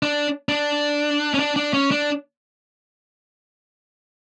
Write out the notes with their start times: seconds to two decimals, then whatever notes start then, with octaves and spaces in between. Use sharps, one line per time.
0.03 D4
0.49 D4
1.34 C#4
1.39 D4
1.56 D4
1.74 C#4
1.91 D4